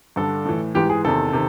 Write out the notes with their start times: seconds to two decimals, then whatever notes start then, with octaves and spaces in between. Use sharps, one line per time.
0.16 G2 D3 A4
0.45 A2 E3
0.75 G#2 E3 G4
0.90 G#4
1.04 E2 C3 D#3 A4
1.33 C3 D#3